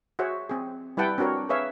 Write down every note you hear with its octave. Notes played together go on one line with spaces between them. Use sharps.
F#4 G#4 C5 C#5 E5 F#5
C4 G#4
G3 E4 B4 F#5 G5 A5
C4 D4 F#4 A#4 C#5
G#4 B4 C#5 E5 F5